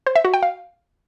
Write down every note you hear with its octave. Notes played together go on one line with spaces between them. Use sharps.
C5
E5
F#4
G5
F5